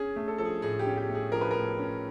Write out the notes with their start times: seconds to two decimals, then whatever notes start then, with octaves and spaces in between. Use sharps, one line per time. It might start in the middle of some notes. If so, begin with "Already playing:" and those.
Already playing: C#4 G#4
0.16 A3
0.28 A4
0.38 F3 A4
0.45 G#4
0.62 A2 G#4
0.79 G4
0.85 C#4
0.97 G4
1.09 A3
1.15 G#4
1.32 F3 A#4
1.41 B4
1.51 A2 A#4
1.79 C#4